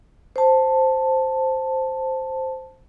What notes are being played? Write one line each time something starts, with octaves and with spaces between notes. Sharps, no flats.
C5 A5